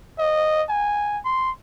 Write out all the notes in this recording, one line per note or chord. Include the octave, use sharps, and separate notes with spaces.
D#5
G#5
C6